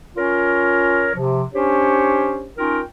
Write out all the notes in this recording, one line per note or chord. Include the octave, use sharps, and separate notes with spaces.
C#4 F4 A#4 C#5 C6
C3 F3
C#4 D4 G4 C5 C#5
C#4 D#4 F4 A#4 G5